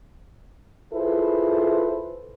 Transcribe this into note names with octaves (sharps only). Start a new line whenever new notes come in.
E4 F4 G#4 A4 B4 C5